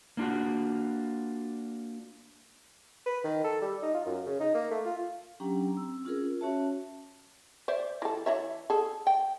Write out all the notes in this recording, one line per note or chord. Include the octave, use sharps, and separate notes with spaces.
A#3 D4 F4 F#4
B4
D#3
A4
G3
D#4
F4
F#2
C#3
D#4
A#3
A3
F4
F#3 C#4 D4 G4 G5 A#5
C4 E6
C#4 F4 G#4 A#4
C#4 F#4 C#5 E5 A5
C5 D5 E5
E3 A4
E3 C#5 E5
G#4 A4
G5